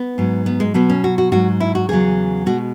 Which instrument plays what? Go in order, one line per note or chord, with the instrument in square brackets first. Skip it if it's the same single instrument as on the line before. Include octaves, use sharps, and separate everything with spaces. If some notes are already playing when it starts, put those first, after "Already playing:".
Already playing: [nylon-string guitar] B3
G#2 F#3
B3
G#3
B2 F#3 B3
C#4
F#4
F#4
G#2 F#3 F#4
E4
F#4
E2 C#3 F#3 G#4
B2 G#3 F#4